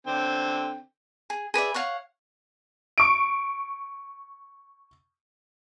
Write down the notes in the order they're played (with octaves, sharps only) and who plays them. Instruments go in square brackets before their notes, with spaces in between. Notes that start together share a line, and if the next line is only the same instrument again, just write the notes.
[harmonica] D3 C4 G5
[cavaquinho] G#4
G#4 B4 D5 E5
C#5 F5 F#5 C#6
[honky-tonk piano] C#6 D7